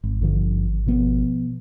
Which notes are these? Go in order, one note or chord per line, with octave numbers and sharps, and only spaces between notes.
G#1
G#1 G2 D3 F3
B2 F3 B3